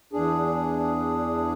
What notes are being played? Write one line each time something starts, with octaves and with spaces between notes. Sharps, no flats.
E2 D4 G#4